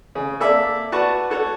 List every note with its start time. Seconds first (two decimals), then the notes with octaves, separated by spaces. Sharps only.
0.15 C#3
0.40 A#3 A4 D5 E5
0.92 F#4 B4 D5 A5 C#6
1.30 F#4 A4 C#5